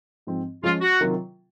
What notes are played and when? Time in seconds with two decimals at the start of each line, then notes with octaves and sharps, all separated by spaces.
0.27 G#2 F3 C4
0.63 F3 G#3 C#4 F4 G#4
0.81 F#4
1.00 C3 D#3 F#3 A#3 F4